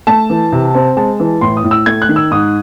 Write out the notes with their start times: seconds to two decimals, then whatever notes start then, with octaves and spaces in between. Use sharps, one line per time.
0.07 A3 A5
0.30 E3
0.52 C3
0.75 C4
0.97 G#3 A5
1.20 E3
1.41 A2 C6
1.57 D#6
1.64 A2
1.71 E6
1.86 A3 G#6
2.02 F#6
2.09 D#3
2.16 E6
2.31 G#2 D#6